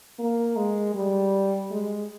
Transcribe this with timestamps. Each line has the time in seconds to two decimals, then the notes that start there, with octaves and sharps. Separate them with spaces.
0.19 A#3
0.56 G#3
0.95 G3
1.71 G#3